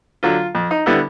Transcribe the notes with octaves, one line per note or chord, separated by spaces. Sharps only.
D3 F#3 F4
F2
D#4
D3 G3 B3 E4